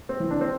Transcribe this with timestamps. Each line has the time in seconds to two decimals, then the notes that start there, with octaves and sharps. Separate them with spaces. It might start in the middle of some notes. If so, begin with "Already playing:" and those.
0.09 C4
0.20 E3
0.31 D4
0.41 C4